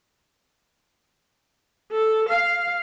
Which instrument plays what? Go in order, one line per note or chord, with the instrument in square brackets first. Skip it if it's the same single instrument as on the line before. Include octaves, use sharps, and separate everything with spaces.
[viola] A4
F5